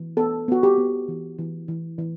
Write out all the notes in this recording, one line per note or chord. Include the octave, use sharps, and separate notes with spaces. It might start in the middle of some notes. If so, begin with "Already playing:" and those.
Already playing: E3
B3 A4
B3 F#4
G4
B3
E3
E3
E3
E3